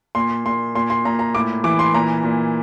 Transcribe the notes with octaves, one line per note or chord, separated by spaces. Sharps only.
A#2 C6
A#2 C6
A#2 C6
C6
A#2 A#5
A#5
A2 D6
E3 D6
C6
A#2 A#5
A#2